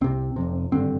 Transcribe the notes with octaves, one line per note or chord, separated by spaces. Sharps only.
C2 C3 C4
F1 F2 C3
G#1 G2 D3 C4